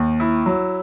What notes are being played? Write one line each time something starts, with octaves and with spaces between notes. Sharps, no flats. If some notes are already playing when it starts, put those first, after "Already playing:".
Already playing: D#2
E4
F#3